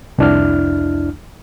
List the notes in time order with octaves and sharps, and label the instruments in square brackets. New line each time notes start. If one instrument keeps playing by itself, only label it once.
[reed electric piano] C2 F2 D4 E4 F6